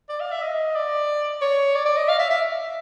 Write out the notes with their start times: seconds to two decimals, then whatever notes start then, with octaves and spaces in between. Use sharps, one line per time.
0.09 D5
0.20 F5
0.31 E5
0.42 D#5
0.76 D5
1.41 C#5
1.75 D5
1.85 D5
1.97 D#5
2.08 F5
2.19 E5
2.30 E5